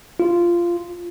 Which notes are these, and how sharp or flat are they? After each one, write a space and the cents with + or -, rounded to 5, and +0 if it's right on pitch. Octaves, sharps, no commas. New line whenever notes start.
F4 -15